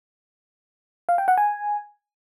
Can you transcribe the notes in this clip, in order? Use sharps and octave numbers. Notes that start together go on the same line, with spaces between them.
F5
G5
F#5
G#5